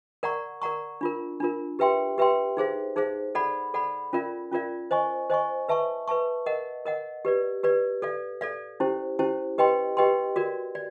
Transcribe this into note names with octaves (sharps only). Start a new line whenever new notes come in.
A#4 D5 F#5 A#5 C#6
A#4 D5 F#5 A#5 C#6
D4 F4 A#4
D4 F4 A#4
G4 B4 E5 G5 C6
G4 B4 E5 G5 C6
D#4 G#4 C5 F5
D#4 G#4 C5 F5
A4 D5 F#5 B5
A4 D5 F#5 B5
C#4 F4 A#4 D5 F5
C#4 F4 A#4 D5 F5
C5 D#5 G#5 C#6
C5 D#5 G#5 C#6
B4 E5 A5 C#6
B4 E5 A5 C#6
A#4 D#5 F#5
A#4 D#5 F#5
G4 B4 D5
G4 B4 D5
A4 D5 F5
A4 D5 F5
C#4 E4 G4 C5
C#4 E4 G4 C5
G4 B4 D#5 G5 C6
G4 B4 D#5 G5 C6
F#4 A#4 D5
D5